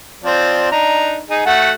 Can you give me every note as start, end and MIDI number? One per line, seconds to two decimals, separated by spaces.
0.24 0.69 53
0.24 0.69 60
0.24 0.69 74
0.72 1.19 62
0.72 1.19 63
0.72 1.19 82
1.30 1.42 63
1.30 1.42 68
1.46 1.72 57
1.46 1.72 66
1.46 1.72 78